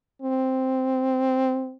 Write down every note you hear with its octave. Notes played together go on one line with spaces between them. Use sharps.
C4